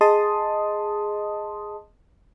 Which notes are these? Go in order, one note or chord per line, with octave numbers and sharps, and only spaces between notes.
G#4 D#5 A5 C6 D#6